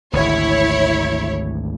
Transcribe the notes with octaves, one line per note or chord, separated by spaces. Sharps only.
G#1 D2 E4 C#5